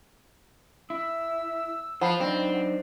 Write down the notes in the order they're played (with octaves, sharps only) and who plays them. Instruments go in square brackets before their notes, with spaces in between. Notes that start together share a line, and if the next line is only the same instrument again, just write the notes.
[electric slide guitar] E4 [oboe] E6
[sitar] F3 [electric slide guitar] C5 [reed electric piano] F#5 B5
[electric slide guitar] F#3 D4 D#4 [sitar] C4